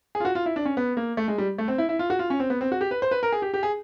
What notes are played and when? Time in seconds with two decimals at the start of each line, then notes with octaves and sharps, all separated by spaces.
0.15 G#4
0.20 F4
0.25 F#4
0.35 F4
0.46 E4
0.56 D4
0.65 C#4
0.77 B3
0.97 A#3
1.17 A3
1.28 G#3
1.38 G3
1.58 A3
1.68 C4
1.78 E4
1.89 E4
1.99 F4
2.10 F#4
2.19 F4
2.30 C#4
2.40 C4
2.50 B3
2.61 C4
2.72 F#4
2.81 G4
2.91 B4
3.02 C5
3.11 B4
3.23 A#4
3.32 G#4
3.42 G4
3.54 G4
3.63 G#4